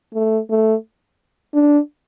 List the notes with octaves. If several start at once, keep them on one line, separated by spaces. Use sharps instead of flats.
A3
A3
D4